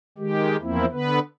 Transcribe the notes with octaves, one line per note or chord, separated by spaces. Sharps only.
D#3 G#3 G4
E2 F3 A#3 C4 E4
D3 B3 B4